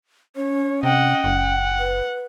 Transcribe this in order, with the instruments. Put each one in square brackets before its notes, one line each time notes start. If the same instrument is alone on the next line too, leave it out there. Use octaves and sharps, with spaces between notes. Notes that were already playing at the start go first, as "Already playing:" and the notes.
[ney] C#4 [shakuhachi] C#5
[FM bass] C3 [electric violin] D#5 F#5 [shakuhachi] G5
[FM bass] F#1 [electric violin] F#5
[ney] B4